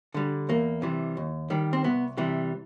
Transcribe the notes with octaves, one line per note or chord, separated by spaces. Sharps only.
D3 G3
E2 A#3
C3 E3 G3
D#2
D#3 G3
C4
C2 B3
C3 E3 G3